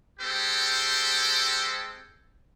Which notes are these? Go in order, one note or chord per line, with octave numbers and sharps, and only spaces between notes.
G#3 C4 G4 A4 C5